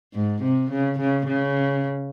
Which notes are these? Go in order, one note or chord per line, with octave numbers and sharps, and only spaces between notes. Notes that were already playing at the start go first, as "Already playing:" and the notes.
G#2
C3
C#3
C#3
C#3